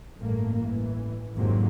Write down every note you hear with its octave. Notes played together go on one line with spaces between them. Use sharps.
A1 G2 A3 A#3
A1 E3
G#1 F2 G#2 C3 F#3 A#3